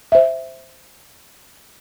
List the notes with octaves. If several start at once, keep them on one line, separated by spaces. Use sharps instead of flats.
C5 E5